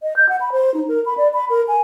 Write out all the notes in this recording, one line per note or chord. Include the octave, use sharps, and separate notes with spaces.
D#5
G6
F#5
B5
C5
D#4
A#4
B5
D5
B5
A#4
G#5